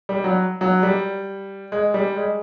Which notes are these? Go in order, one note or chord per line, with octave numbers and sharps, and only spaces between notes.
G3
F#3
F#3
G3
G#3
G3
G#3